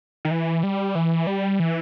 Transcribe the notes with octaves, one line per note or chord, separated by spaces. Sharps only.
D#3
E3
G3
E3
G3
E3